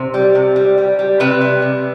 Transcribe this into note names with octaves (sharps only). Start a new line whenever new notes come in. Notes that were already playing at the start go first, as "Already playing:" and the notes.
Already playing: C3 C5
G3
C3
G3
G3
G3
C3 B4
G3
C3